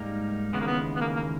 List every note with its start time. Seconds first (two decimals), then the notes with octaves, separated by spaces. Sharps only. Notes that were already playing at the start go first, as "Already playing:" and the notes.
Already playing: G#2 G3 A#3 D#4 A#4
0.53 D#2 C#3 E3 G#3 B3
0.61 A#3
0.67 B3
0.96 B3
1.01 A#3
1.16 A#3